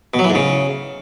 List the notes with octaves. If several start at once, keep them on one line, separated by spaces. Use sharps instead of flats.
B2
F#3
E3
G#2
C#3